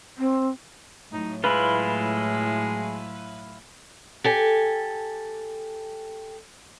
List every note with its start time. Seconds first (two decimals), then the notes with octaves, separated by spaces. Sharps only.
0.18 C4
1.13 A2 F#3 D#4
1.44 G#3 E4 F4 B4
4.24 G4 A4 G#5